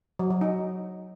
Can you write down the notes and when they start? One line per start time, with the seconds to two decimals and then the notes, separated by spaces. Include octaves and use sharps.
0.19 F#3
0.30 F#3
0.41 D#4